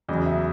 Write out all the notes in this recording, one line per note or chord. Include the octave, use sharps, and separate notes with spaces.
E2 C#3 F#3 D#5
E5